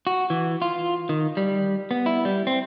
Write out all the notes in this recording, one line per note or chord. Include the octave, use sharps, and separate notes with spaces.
F#4
E3
F4
D#3
G3
B3
E4
G3
C4